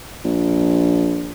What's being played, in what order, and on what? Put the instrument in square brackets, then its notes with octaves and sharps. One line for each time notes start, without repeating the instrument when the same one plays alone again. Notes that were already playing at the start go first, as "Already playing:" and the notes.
[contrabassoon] A#1